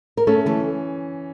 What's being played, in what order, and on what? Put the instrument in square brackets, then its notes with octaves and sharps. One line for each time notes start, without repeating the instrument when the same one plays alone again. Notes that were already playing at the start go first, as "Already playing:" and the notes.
[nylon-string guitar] A#4
[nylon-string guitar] A3 A4 [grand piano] C#4
[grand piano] E3 [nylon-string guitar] A3 A4